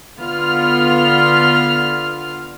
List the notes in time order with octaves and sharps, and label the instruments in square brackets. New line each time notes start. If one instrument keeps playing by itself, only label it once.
[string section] D3 B3 F4 F6